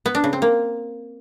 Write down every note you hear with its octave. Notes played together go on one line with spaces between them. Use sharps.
B3
D4
C#3
C4
A#3